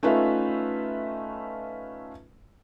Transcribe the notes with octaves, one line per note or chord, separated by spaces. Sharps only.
A3 C#4 D#4 F4 B4 E5